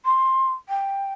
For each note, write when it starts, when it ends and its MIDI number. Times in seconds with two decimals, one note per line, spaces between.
0.05 0.50 84
0.69 1.13 79